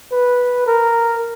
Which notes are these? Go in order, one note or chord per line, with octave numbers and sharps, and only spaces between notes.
B4
A#4